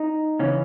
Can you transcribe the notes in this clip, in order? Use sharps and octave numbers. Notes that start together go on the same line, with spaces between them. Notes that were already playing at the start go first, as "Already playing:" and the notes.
Already playing: D#4
C#3 E3 C#4